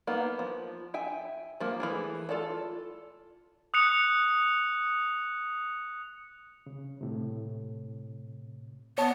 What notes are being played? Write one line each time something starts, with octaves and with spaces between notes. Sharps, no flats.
A#3 B3 D#4 F5
F3
E5 G5 G#5
F3 A#3
E3 A3 G#4
F4 A4 D5 A5
D#6 F#6 C#7 F7
C#3
A2 C3
B3 C#5 A5